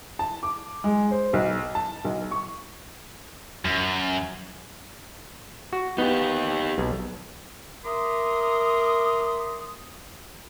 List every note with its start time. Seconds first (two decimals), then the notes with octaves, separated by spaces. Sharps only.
0.19 A5
0.43 D6
0.84 G#3
1.11 C5
1.33 B1
1.75 A5
2.05 B1
2.31 C#6
3.65 F#2
5.73 F#4
5.98 B3 D#4 G4
6.78 B1
7.85 A#4 E5 A#5 C6 D6 D#6